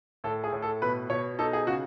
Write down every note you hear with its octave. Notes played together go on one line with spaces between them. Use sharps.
A2 A4
G#4
A2
A4
B2 B4
B2 C#5
D#4 A4
G#4
C#3 F#4